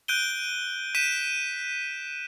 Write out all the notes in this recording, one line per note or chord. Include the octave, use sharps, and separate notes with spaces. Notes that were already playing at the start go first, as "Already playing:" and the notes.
F#6 G6 D7 D#7 G7
G6 B6 D#7 E7